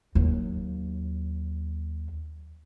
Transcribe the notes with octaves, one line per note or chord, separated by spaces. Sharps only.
D#2 F#3